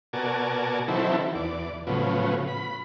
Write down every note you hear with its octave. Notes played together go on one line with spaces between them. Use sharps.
B2 F#4 A#4 D5 G#5 A5
D#3 E3 F#3 C4 E4 A4
E2 D5
A2 C#3 F3 F#3 B3
B5